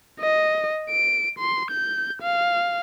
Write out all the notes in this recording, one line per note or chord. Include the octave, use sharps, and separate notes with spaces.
D#5
D7
C6
G6
F5